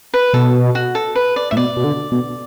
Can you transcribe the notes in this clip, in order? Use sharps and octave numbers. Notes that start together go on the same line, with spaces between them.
B4
B2 A4
F#4
A4
B4
D5
A2 E5
B2 D5
B2
D3
B2